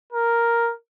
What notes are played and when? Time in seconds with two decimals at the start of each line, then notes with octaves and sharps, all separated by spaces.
0.12 A#4